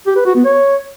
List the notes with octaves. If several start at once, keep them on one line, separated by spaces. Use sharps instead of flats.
G4
B4
F#4
B3
C#5